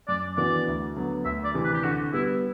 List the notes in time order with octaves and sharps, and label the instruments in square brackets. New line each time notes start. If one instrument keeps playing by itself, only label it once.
[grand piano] F#2 [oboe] D5
[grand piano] E3 B3 D4 F#4 [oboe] D5
[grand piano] D2
D3 F#3 B3
[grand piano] D2 [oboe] E5
[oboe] D5
[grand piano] C3 E3
[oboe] B4
G4
[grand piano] D3 [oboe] F#4
[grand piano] G3 B3 [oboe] E4